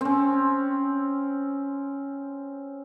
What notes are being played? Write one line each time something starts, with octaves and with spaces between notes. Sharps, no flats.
C4 C#4